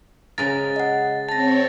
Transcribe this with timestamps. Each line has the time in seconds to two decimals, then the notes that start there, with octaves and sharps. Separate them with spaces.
0.38 C#3 G#3 A#4 A6
0.76 D#5 F#5
1.29 C4 C#5 A5 A6 A#6